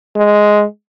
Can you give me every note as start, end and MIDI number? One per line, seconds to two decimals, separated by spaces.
0.16 0.64 56